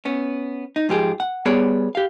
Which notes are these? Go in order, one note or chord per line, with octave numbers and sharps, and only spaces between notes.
B3 C#4
D#4
G#2 F3 G4 G#4
F#5
G3 B3 G#4 C#5 D5
G4 F5